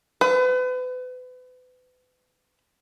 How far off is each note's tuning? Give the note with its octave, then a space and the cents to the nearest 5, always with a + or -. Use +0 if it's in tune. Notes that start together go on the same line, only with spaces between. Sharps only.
B4 +35